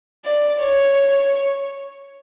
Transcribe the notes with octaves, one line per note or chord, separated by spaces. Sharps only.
D5
C#5